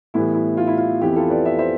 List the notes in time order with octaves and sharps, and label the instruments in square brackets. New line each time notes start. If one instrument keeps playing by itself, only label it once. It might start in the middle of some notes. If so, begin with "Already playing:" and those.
[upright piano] A2 E3 G3 B3 E4
E4
F4
E4
F4
F2 E3 B3 E4 G4
F4 A4
B4 D5
E5
C5 E5